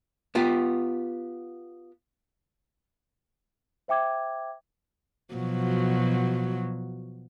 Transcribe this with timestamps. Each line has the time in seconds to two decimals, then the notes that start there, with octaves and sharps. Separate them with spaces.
0.35 B3 F4 G4
3.88 C5 E5 G5 D6 G#6
5.34 B2 F3 F#3